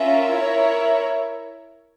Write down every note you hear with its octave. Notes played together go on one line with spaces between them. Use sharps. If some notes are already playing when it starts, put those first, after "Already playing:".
Already playing: C#4 F4 A#4 E5
E4 A#4 C#5 E5